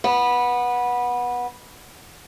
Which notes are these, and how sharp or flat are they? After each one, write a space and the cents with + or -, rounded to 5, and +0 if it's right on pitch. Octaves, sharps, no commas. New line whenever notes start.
B3 -15